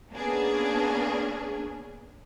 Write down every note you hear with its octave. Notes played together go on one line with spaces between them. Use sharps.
A#3 B3 C#4 D4 G#4